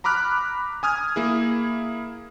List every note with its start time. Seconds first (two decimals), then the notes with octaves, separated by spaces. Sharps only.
0.04 A#5 B5 D6 F6 F#6
0.83 G#5 D#6 F6 G#6
1.16 A#3 E4 G#4